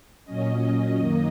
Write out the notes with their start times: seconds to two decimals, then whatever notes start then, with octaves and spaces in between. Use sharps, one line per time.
0.25 A#2 F#3 C#4 D#5
0.97 F#2 D#3 A#3 D#5